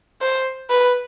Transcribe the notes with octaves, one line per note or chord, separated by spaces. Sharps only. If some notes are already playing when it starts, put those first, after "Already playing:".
C5
B4